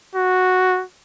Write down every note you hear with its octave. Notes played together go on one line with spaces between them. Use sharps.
F#4